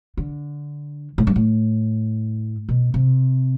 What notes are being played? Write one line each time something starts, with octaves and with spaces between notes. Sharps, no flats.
D3
A2
G2
A2
B2
C3